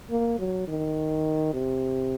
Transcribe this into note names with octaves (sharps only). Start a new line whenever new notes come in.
A#3
F#3
D#3
C3